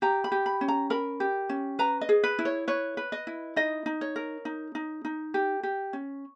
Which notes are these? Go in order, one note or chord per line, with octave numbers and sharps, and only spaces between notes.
G4 A#5
B5
G4
B5
C#4
A#5
A#4 B5
G4
C#4
B4 A#5
D#5
G#4
B4
E4
C#5
B4 C#5
B4
D#5
E4
D#4 D#5
D#4
C#5
A#4
D#4
D#4
D#4
G4
G4
C#4